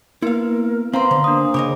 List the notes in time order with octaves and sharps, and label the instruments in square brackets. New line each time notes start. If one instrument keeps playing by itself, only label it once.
[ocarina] A#3 [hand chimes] B3 [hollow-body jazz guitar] E4 F5 [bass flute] A#4
[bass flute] B3 [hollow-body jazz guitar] C4 [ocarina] C5 [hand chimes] F5 A#5 C6
[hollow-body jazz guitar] D3 [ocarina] C5
[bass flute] A#3 [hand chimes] D4 D#6
[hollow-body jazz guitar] C#3 C#5 D#5 [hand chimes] D6